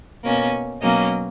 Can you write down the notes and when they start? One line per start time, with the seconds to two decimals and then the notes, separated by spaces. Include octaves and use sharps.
0.24 B2 A#3 C#4
0.82 B2 F#3 A#3 C#4 D#5